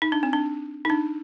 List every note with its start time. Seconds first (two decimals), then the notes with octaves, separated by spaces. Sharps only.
0.02 D#4
0.12 D4
0.23 C4
0.33 D4
0.85 D#4
0.90 D4